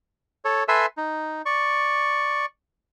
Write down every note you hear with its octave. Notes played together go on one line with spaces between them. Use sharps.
A4 C#5
A4 B4 E5 G#5 C6 E6
D#4
D5 C#6